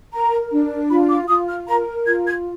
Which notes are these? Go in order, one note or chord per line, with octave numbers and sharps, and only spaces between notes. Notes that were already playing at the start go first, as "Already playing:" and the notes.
A#4 A#5
D4
F4 B5
D6
F4 D#6
F6
A#4 A#5
F4 G#6
G#6